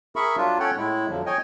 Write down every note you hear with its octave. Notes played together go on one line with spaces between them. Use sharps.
G#4 A#4 E5 B5 C#6
F#3 D4 F4
C#4 A4 C#5 F#5 G5
A2 G#3 E4
F2 D3 F3 F#3
C#5 D#5 G5 G#5